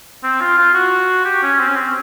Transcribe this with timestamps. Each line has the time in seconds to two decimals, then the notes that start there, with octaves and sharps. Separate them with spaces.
0.23 C4
0.41 F4
0.58 F4
0.74 F#4
1.25 G4
1.43 C#4
1.60 C4
1.68 C#4
1.76 C4